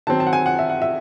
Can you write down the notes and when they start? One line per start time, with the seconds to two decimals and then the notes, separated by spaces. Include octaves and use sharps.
0.07 D#3 F#3 C4 A5
0.20 A5
0.27 F#5
0.33 G#5
0.46 F#5
0.59 E5
0.69 F#5
0.82 E5